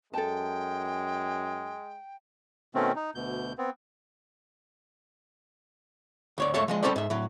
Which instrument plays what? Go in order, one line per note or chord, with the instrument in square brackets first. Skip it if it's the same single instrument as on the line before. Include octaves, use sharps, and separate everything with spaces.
[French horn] F#2 [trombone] G#3 [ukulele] A4 A5 [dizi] G5
[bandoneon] B2 D#3 A3 C4 C#4
D#4
D2 B2 G6
B3 C4
[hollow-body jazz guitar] D2 C#5 D5
C#2 F#2 A3 C#5 E5
F3 G#3 D#5
G3 A#3 C#4 A4 C5 D5
G#2 E5
A2 F#3